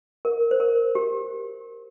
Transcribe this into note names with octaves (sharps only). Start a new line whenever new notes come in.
A#4
C5
A#4
G4